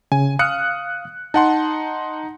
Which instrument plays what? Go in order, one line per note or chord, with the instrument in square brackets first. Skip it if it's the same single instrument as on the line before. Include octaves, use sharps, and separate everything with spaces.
[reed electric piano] C#3 [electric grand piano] G#5
[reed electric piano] F5 F6 [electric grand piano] D#6 F#6 C#7
[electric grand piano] D#4 F#5 C6 [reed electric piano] A5